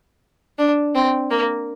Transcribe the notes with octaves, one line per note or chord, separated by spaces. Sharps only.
D4
C4
A#3